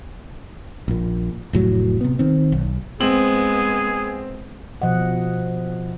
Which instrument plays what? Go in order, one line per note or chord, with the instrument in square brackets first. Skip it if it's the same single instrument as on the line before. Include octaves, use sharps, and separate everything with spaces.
[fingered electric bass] A#1 A#2
F1 A2 F#3
C3 B3
D#3 C4
B1
[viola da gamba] G#3 B3 [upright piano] C4 F#7 [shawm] G#4
[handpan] B2 F3 D#5 F#5